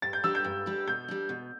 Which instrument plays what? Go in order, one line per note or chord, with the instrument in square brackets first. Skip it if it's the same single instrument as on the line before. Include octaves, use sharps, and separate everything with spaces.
[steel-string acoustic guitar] G2 [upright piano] A6
[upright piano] G6
[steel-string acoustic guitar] G3 D4 G4 [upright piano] E6
[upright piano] G6
[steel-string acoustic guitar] G2
G3 D4 G4
[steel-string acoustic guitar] B2 [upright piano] G6
[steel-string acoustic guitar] G3 D4
B2